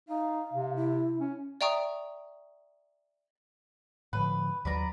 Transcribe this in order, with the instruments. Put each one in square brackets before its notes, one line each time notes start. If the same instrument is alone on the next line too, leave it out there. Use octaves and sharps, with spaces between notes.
[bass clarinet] D#4 [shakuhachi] F5
[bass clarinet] C3
[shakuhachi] E4
[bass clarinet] C#4
[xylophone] D5 E5 G5 A#5 C#6 D#6
[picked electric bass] A2 D3 F3 [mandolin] B4
[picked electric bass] D#2 F#3 [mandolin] B4 D5 A#5